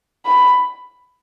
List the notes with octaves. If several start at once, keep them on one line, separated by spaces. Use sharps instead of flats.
B5